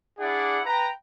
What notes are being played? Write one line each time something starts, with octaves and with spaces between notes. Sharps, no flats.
D4 E4 G#4 D5 F#5
B4 G5 A#5